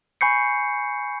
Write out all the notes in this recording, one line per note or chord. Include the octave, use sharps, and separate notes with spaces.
G#5 B5 C#6 G6 C7 C#7